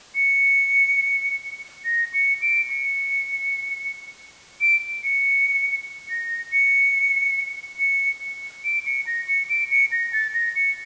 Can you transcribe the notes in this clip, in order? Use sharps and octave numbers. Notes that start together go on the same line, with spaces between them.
C#7
A#6
C#7
D7
C#7
D7
C#7
A#6
C#7
C#7
D7
C#7
A#6
C#7
D7
C#7
A#6
A6
A#6
C#7